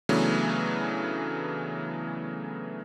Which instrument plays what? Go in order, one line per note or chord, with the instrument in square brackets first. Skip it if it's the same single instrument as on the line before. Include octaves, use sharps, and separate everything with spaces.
[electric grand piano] C#3 E3 F#3 A3 B3 D4